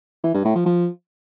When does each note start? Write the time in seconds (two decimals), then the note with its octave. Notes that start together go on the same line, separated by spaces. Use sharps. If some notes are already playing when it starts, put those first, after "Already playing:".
0.24 E3
0.34 G2
0.45 A2
0.55 F3
0.66 F3